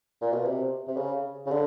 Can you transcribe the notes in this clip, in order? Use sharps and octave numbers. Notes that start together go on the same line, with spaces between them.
A#2
B2
C3
C3
C#3
C#3
D3